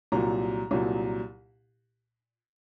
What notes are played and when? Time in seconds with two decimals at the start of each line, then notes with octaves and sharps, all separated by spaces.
0.12 C2 A#2 F#3 A#5
0.71 C2 A#2 F#3